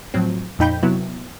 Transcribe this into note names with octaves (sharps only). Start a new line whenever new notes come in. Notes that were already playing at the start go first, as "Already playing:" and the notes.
A2 F3 F#3 C4
F2 A#2 D#4 G5 B5 G6
C3 F#3 B3 E4